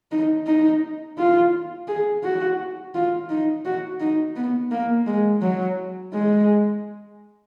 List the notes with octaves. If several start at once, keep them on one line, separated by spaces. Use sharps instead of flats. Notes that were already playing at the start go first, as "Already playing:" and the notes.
D#4
D#4
F4
G#4
F#4
F4
D#4
F#4
D#4
B3
A#3
G#3
F#3
G#3